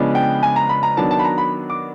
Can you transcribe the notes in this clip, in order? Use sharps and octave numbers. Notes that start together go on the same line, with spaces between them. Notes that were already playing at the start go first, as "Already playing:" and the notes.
Already playing: C#3 F3 G#3 B3 D4
G5
G#5
A#5
B5
A#5
D#3 F#3 B3 D4 A5
A5
B5
A#5
B5
D6